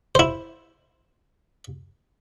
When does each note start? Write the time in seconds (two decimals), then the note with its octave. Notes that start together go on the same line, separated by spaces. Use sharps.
0.15 E4 C5